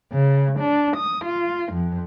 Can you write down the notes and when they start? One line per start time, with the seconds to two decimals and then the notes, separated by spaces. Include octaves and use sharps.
0.12 C#3
0.59 D4
0.96 D#6
1.25 F4
1.72 F2